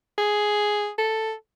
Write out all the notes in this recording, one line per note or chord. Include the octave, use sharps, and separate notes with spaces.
G#4
A4